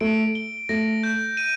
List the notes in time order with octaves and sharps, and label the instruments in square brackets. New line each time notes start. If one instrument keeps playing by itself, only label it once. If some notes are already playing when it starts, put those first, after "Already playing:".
[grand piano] A3 [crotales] D7
[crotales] G7
[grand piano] A3 [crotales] A#6
[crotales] G6
D#7